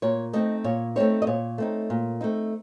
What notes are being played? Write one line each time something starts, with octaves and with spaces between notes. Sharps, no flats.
A#2 C#5
A3 C4 D#4 D#5
A#2 C#5
A3 C4 D#4 C#5
D#5
A#2 C#5
A3 C4 D#4
A#2
A3 C4 D#4